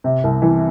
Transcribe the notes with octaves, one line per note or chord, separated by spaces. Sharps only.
C3
C2
E3